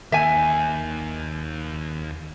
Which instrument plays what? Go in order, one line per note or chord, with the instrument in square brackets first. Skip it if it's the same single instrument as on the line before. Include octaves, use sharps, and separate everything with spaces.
[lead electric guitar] D#2 [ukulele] E5 G#5